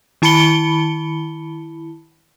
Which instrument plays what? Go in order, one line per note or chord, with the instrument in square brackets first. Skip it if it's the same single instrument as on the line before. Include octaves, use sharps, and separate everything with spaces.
[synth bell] D#3 E4 A5 B5 C#7 G7